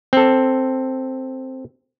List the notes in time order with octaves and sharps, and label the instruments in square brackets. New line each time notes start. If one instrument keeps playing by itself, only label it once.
[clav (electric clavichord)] C4 A4